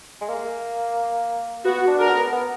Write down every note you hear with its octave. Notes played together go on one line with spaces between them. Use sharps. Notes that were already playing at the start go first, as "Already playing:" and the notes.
G#3
A#3
B3 F#4
D4
A#4
B3
B3